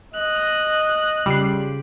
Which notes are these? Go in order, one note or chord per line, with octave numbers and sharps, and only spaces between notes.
D#5 F#6
C#3 G3 F4 G4 C7